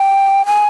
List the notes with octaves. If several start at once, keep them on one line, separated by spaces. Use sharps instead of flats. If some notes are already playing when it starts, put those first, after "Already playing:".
Already playing: G5
G#5